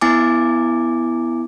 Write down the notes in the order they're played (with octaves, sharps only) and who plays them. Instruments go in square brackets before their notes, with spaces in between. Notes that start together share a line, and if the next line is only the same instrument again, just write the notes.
[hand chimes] B3 E4 G#5 D6